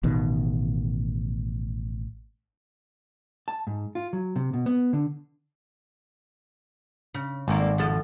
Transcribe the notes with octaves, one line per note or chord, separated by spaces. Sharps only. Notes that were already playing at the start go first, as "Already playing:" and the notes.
A1 B2 D#3
A5
G#2
F4
F#3
C3
B2
B3
D3
C#3
G#1 A3 A#3 D5
B2 F3 A4